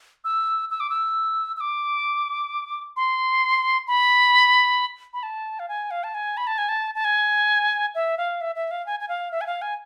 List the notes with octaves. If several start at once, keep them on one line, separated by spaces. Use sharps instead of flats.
E6
E6
D6
E6
E6
D6
C6
B5
B5
A5
F5
G#5
F5
A5
G#5
B5
A5
G#5
A5
A5
G#5
E5
F5
E5
E5
F5
G#5
G#5
F5
E5
G#5
F5
G#5